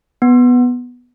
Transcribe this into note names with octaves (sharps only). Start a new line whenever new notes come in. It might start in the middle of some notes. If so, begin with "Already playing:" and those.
B3